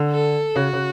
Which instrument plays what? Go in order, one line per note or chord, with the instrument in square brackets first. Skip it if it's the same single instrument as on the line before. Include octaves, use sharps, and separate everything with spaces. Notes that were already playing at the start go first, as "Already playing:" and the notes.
Already playing: [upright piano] D3
[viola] A4
[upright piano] C#3 [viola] F#4
[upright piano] C#3